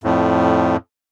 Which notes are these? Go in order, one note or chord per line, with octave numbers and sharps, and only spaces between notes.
F2 A2